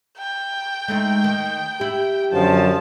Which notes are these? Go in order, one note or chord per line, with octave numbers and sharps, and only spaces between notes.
G5
G#3 A3 D#4
D#3
E4 G4
F#2 D3 F3 A5